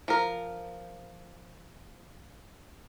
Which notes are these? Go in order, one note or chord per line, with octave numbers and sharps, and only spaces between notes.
F3 A#4